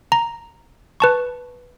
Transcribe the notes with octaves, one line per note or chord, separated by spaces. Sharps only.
A#5
B4 A5 C#6